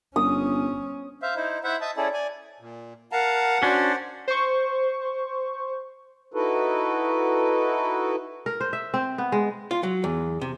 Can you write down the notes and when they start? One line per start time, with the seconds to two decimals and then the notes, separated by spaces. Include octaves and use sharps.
0.16 G1 C#4 D#6
1.22 C5 E5 F5
1.36 D#4 E4 C5
1.64 E4 C5 E5 F#5
1.81 D#5 E5 A5
1.97 C#4 E4 G#4 A4 D5
2.14 D5 G#5
2.60 A#2
3.12 A#4 F5 F#5 A5 A#5
3.63 C#4 D4 F#4 C5 D5
4.28 C5 C#6
6.34 D#4 E4 F#4 A4 B4
8.46 A#4
8.61 C5
8.73 E5
8.94 C4
9.18 B3
9.32 G#3
9.71 F4
9.83 F#3
10.04 E2
10.41 C3